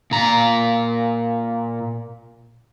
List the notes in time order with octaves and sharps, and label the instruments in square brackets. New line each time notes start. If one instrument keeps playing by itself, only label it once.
[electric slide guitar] A#2 A#5